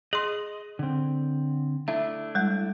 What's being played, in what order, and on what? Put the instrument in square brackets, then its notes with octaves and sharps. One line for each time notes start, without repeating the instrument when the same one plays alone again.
[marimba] G#4 C6 [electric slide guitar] D#5
[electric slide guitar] D3 C4
[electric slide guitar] A3 D4 E4 [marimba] E5
[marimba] G3 G#3